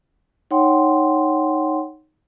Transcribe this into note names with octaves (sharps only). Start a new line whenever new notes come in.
D#4 C#5 F#5 G5 C6